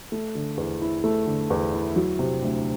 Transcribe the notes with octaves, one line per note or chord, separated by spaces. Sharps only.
A3
D3
E2
E4
A3
D3
E2
E4
F#3
C3
D2